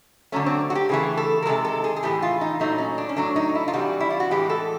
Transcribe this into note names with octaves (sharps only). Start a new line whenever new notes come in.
D3 F#3 A3 C#4
C4
F#4
G4
C#3 E3 A3 G#4
A4
A#4
C3 D#3 G#3 A4
A4
G#4
G#4
A2 E3 G#3 G4
F4
D#4
A#2 F#3 A3 D#4
C#4
D4
C#4
A2 F#3 A3 D4
D#4
E4
F4
C3 E3 G3 F#4
E4
F4
F#4
A2 E3 G#3 G4
A4